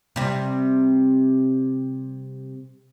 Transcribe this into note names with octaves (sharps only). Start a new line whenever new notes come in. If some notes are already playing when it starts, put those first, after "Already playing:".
C3 G3